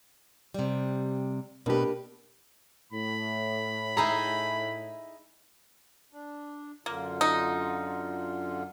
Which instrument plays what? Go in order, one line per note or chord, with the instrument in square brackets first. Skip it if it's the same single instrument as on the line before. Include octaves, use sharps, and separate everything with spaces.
[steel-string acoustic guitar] C3 G3
[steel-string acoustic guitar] B2 B4 [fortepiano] A#3 D4 G4
[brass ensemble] A2 [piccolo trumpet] B5
[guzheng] D#4 E4 G#4 [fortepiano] A#5
[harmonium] D4
[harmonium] F#2 D3 F4 [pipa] A#3
[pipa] D#4